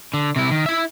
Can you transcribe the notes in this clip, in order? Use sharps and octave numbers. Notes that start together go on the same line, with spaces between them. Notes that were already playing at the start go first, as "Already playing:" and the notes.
D3
C3 E4
D#3
E4 E5